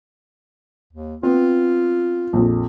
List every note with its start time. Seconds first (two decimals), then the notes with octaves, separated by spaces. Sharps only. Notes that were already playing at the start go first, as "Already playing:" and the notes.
0.93 D#2
1.23 B3 C4 F4
2.33 A#1 F2